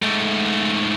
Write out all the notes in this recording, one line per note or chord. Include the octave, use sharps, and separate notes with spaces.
G#2 A3